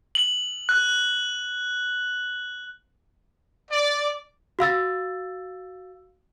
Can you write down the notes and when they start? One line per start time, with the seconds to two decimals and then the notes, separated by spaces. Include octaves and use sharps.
0.15 F#7
0.69 F#6
3.71 D5
4.59 F#4 F5 E6 A6